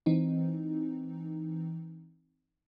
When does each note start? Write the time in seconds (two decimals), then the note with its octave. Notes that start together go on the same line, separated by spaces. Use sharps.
0.06 E3 C4 D#4